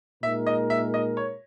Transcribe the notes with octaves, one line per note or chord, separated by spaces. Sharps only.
A#2 G#3 D#4 A#4 E5
D#5
E5
D#5
C#5